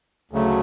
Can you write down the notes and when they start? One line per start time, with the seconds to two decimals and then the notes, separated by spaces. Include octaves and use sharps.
0.31 D2 C#3 F#3 A3